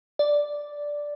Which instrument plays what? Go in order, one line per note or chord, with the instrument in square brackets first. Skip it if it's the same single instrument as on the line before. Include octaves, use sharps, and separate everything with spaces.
[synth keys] D5